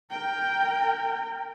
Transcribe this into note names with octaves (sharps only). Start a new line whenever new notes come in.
A#4 G5